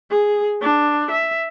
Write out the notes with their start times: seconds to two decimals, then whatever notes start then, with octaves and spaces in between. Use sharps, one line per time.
0.10 G#4
0.62 D4
1.11 E5